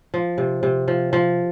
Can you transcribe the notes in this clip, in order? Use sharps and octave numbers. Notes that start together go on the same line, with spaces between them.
F3
C3
C3
F3
F3